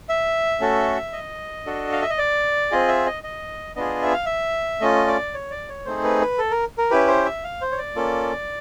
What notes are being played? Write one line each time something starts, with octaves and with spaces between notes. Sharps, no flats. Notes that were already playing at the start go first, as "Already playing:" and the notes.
E5
A3 C#4 F#4 A4
D#5
D4 F#4 A4
F5
E5
D#5
D5
C4 F4 G#4 D#5
E5
D#5
D#5
B3 D4 F4 G#4 D#5
E5
F5
E5
A3 C#4 F4 D#5
D5
C#5
D5
C#5
A3 C4 D#4 G#4 C5
B4
B4
A4
A#4
A#4
C#4 E4 G4 B4
C5
E5
F5
C5
C#5
D5
A#3 C#4 F4 A4